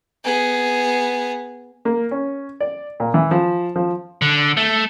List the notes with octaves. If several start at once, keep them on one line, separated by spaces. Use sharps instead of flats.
B3 G#4
A#3
C#4
D5
A#2
E3
F3
F3
D3
A3